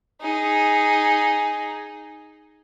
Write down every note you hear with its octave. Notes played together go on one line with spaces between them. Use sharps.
D#4 G#4